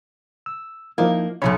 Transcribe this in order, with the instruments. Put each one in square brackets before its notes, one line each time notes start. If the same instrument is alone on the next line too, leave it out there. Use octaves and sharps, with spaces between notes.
[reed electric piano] E6
[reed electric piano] F3 D#4 E4 [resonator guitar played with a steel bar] A#3
[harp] B1 C#7 [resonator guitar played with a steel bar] F#2 C#3 [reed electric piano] C#5 B5